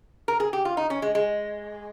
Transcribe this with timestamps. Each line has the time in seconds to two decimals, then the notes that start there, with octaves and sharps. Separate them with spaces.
0.28 A#4
0.40 G#4
0.53 G4
0.65 F4
0.77 D#4
0.90 C#4
1.02 G#3
1.15 G#3